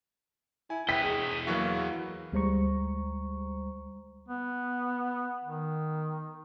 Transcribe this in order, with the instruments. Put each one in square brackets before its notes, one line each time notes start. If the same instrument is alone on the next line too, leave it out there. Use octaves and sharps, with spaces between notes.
[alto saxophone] E4 [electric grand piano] G#5
[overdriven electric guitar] E2 D#5 [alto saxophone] E3 [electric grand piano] G5 [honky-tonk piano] B6
[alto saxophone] G#4
[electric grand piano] E3 F#3 F#4 [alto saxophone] A#3
[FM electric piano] D2 G3 G#3 C5 A#5 C#6
[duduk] B3
D#3